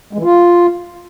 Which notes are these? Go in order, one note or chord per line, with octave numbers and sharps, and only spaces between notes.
G#3
E3
F4